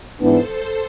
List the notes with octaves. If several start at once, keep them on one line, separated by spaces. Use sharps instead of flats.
G#2 E3 B3 D4 A4 C5